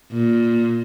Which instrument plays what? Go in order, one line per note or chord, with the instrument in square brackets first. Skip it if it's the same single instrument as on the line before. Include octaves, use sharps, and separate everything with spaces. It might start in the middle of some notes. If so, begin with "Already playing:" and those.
[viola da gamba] A#2